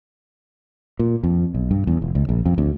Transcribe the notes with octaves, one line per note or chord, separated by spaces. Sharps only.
A#2
F2
B1
G2
E2
F1
C#2
A#1
F2
D2